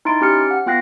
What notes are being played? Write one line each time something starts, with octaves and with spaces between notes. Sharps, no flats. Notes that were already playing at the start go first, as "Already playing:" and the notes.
D#4 E4 C6 A6 D7
C#4 G4 F6 C#7
F#5
B3 F4 G5 F#6 A#6 C7